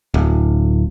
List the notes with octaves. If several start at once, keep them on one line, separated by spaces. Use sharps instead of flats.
D1